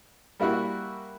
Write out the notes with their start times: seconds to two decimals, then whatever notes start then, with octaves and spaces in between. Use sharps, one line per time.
0.40 G3 A#3 E4 F#4